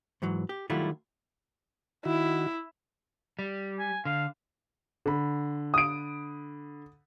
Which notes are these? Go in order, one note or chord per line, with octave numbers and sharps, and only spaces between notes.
G#2 E3 F#3
G4
D#3 F#3 G3 A3 E4 F4
D#3 E4 F#4
G3
G#5
D3 F5
D3 B5
D#6 D7